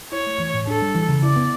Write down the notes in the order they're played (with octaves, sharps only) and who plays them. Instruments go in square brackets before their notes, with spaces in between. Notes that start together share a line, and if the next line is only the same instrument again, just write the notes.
[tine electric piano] E4 [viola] C#5
[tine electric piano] A3
E3
A2
[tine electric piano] D4 [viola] A4
[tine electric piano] G3
E3
C#3
[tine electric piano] E4 [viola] D5
[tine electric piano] B3